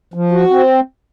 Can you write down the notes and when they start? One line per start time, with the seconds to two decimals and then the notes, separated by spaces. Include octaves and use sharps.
0.14 F3
0.32 F#4
0.50 C4